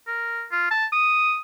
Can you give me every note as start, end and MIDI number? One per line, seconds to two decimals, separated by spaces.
0.07 0.44 70
0.51 0.67 65
0.71 0.86 81
0.92 1.39 87